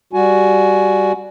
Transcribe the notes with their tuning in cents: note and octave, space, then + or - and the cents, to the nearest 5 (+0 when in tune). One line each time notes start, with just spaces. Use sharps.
G3 +0 F#4 +0 G#5 +20